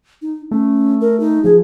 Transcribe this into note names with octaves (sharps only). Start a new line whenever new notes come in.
D#4
A3 C#4
A#4
D#4
F3 G#4